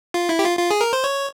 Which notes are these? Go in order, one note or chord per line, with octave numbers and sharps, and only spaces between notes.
F4
E4
G4
F4
F4
G#4
A#4
C5
C#5